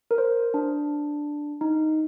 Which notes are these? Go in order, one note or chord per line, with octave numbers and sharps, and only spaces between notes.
A#4
C5
D4
D#4